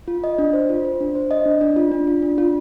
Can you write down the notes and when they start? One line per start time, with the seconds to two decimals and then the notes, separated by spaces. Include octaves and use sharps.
0.08 F4
0.24 D#5
0.38 D4
0.53 C5
0.69 F4
0.85 C5
1.00 D4
1.15 C5
1.31 D#5
1.46 D4
1.61 D4
1.76 F4
1.92 D4
2.07 F4
2.22 D4
2.38 F4